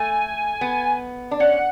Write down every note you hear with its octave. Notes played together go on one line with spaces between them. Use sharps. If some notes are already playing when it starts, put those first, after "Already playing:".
Already playing: A3 G#5
B3
D4
C#4 F#5